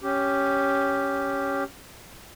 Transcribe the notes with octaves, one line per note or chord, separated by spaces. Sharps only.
C#4 G4